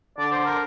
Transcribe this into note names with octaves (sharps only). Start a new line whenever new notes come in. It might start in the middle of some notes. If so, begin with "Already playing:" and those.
D3 D5
C5
A#4